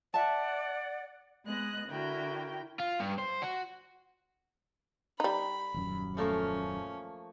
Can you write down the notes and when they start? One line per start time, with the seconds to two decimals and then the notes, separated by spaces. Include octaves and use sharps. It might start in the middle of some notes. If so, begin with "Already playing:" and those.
0.14 D5 E5 F#5 A5
1.45 G#3 B3 D#5 F#6
1.88 D3 E4 F#4 A#4 G5
2.80 F4
3.00 G2
3.18 C5
3.42 F#4
5.20 G3 D#4 B5
5.74 D#1 F#2
6.17 F3 A3 A#3 C#4